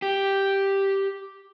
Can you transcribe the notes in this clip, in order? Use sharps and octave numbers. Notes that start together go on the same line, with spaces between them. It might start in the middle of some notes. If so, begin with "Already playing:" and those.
G4